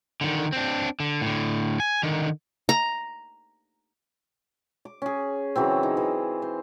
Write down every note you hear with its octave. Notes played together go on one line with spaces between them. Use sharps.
D3 D#3
C4 D4
D3
A2 D3
G#5
D3 D#3
A#5
D6
C#4 G#4
C#3 E3 F#3 C4
D#4
E3
C5